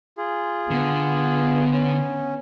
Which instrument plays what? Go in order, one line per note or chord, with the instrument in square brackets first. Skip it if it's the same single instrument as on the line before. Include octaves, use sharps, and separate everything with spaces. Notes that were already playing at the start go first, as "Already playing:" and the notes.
[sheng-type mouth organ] F4 G#4
[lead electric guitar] D3 [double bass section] B3
[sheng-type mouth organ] C#4